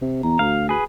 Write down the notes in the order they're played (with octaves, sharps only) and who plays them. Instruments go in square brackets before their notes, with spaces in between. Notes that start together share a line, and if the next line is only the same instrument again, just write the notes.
[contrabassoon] C3
[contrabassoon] E2 [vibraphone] A#5
[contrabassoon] D2 [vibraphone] F#4 [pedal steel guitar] F5
[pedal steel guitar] G#4 B4